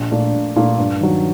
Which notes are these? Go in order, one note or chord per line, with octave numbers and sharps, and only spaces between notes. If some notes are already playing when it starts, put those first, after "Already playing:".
Already playing: A#1
A#2 A3 D4
A#1
A#2 A3 D4
G2
D#3 F#3